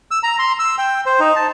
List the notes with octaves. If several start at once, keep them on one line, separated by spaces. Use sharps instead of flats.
E6
A#5
C6
E6
G5
C5
D#4
A5